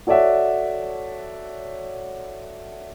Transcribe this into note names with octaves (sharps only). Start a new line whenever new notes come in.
F#4 A4 C#5 D5 E5 F#5